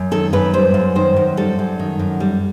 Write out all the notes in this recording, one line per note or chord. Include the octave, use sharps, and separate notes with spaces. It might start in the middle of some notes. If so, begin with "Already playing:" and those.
Already playing: F#2
D#3 A4
F#2 B4
G3 C5
F#2
D#3 C5
F#2
G3 A4
F#2
D#3
F#2
G3